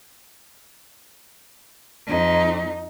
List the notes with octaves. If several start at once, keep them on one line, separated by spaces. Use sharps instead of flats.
F2 D#4